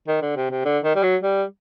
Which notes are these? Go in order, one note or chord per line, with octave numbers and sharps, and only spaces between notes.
D#3
D3
C3
C3
D3
D#3
G3
F#3
G3